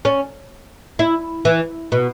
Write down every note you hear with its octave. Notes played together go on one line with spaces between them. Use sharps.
C#4
E4
E3
B2